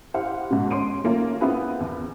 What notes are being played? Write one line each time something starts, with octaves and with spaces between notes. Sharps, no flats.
E4 G4 C5 F5 F#5
G#2 B2
C#4 C6 D7 D#7
A3 A#3 C#4 F4
B3 C4 E4 F4 G#4 B4
E2